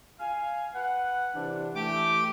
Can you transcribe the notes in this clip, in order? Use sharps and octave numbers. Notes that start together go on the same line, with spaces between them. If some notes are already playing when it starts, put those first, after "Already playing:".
F5 G#5
B4 F#5
C3 E3 D4
E3 A3 G4 D6